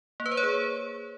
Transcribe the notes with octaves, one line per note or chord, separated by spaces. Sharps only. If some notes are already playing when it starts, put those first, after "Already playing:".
A#3
B4
C5
C#5
G#4